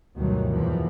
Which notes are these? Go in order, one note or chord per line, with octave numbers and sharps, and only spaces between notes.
D2 G2 B2 D#3 E3 F#3
E2 A#2 E3 F3